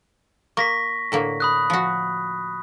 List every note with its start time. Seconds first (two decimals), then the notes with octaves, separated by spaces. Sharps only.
0.57 A#3 C#6 A#6 B6
1.12 A2 D3 A#3
1.40 B5 D#6 F#6
1.70 F3 F#4